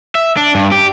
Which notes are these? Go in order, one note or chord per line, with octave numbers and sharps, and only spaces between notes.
E5
D4
G2
G4